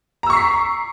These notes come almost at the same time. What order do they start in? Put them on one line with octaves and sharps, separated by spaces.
A#5 E6 C#6 C7 B6